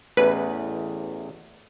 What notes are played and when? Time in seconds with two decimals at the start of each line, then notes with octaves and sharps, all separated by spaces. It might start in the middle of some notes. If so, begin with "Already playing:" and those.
0.17 A1 E2 B4